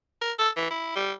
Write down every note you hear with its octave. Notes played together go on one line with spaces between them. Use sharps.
A#4
A4
E3
E4
G3